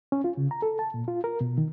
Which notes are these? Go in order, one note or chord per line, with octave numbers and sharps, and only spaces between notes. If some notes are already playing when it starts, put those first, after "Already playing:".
C#4
F4
C#3
A#5
A4
A5
A#2
F4
A#4
B2
D#3